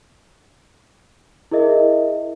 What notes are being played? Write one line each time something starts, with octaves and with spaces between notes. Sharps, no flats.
E4 G#4 A#4 D#5 E5